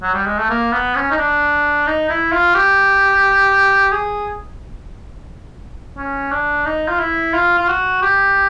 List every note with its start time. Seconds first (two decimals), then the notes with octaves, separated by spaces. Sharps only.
0.03 F#3
0.15 G3
0.26 G#3
0.39 A3
0.50 A#3
0.72 B3
0.96 C#4
1.11 D#4
1.18 D4
1.87 D#4
2.10 E4
2.33 F4
2.55 G4
3.92 G#4
5.97 C#4
6.32 D4
6.65 D#4
6.88 F4
7.00 E4
7.34 F4
7.58 F4
7.68 F#4
8.02 G4